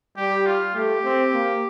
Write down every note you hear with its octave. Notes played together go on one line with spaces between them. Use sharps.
G3 G4
F4
A3 G4
C4
A#3